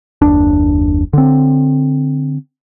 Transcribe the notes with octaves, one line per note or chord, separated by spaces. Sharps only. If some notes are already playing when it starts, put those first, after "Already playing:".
F#1 D#2 D4
D3 C4